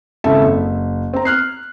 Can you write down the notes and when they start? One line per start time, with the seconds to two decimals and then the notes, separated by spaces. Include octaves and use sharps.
0.24 G#1 C#3 E4 A4 E5
0.42 F#1
1.13 C4 A#5
1.25 F6 F#6 C7